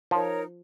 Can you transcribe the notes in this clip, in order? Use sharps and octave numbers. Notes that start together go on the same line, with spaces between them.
F3 D#4 A#4 C#5